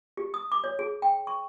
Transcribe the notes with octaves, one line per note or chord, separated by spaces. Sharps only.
G4
D#6
D6
C#5
G#4
G5
C#6